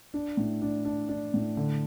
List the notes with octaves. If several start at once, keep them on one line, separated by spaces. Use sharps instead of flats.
D4
A2
D4
D4
D4
A2
D3